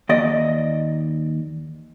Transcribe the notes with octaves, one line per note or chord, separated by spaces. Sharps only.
D#2 D5 D#5